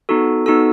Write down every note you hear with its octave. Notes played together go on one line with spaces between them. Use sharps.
B3 D#4 F#4 A4
B3 D#4 F#4 A4 E6